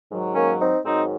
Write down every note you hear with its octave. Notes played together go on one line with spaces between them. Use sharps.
G#2 D#3 F#3
A#3 C#4
C4 D#4
G#2 D#3 F#3 C4 D#4